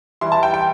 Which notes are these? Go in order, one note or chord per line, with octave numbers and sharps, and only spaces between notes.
E3 G3 E4 C6
A5
G5
G5